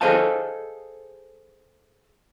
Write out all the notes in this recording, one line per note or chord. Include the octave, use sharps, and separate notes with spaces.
G#4 A4 C5 D#5 F5 A5